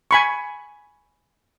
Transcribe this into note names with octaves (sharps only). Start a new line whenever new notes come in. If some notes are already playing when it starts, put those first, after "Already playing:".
G#5 B5 C#6